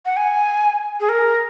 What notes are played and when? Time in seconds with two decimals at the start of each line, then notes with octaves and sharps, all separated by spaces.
0.06 F#5
0.17 G#5
1.00 G#4
1.09 A#4